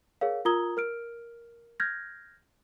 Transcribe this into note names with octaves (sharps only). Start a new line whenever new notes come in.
G#4 A#4 C#5 F5
F4 A#4 A#5 D#6 G#6 G7
A#4 F6 D7
F6 G6 G#6 A#6